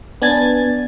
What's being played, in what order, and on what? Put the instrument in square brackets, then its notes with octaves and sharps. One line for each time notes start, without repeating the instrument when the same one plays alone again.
[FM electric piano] B3 D4 G#5 G#6 A6